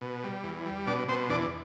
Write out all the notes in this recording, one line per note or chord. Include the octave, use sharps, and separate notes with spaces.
B2
G3
E2
G3
B2 D4 D5
B2 C4 C5
E2 D4 D5